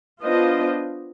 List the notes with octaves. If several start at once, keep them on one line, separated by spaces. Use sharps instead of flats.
B3 D4 F4 C5 D#5